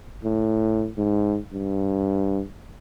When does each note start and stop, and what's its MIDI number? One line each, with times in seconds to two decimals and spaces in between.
0.24 0.88 45
0.98 1.38 44
1.53 2.43 43